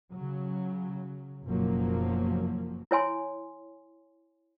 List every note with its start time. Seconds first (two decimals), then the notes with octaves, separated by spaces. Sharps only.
0.14 C#3 F#3
1.44 F#1 F#2 B2 F3 F#3 A#3
2.91 E4 C#5 G#5 C6